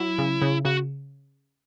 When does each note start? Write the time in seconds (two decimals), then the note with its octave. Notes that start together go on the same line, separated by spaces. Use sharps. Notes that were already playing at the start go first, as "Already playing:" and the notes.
Already playing: F#3 E4
0.18 C#3
0.42 C#3
0.65 C#3 F#4